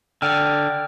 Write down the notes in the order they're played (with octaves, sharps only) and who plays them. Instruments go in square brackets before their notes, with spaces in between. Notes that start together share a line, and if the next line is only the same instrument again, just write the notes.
[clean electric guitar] D3 [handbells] D5 G5 F6